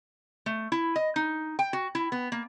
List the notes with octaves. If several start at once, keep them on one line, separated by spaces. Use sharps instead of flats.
A3
E4
D#5
D#4
G5
F#4
E4
B3
A#3